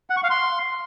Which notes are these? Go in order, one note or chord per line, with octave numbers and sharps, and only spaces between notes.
F#5
C#6
F5
C6